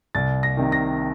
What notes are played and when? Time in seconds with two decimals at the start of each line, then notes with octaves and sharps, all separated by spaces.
0.15 C2 A6
0.43 A#6
0.57 C3 D#3
0.72 A#6